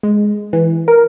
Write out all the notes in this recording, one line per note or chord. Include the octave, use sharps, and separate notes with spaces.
G#3
E3
A#4